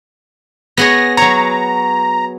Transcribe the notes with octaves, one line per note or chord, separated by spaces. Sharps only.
B3 G#4 C#5 A#6
F#3 C#5 A#5